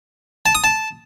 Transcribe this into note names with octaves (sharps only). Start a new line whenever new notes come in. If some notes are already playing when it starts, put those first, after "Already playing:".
A5
D#6
A5